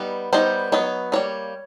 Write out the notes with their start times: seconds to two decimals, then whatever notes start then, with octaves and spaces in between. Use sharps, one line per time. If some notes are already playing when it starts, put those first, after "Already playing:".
Already playing: G3 B3 D#4
0.33 G3 B3 D#4 C5
0.72 F#3 B3 D#4 C#5
1.12 G3 A#3 D#4 C#5